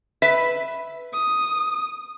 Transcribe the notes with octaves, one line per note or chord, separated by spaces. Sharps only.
B4 E5
D#6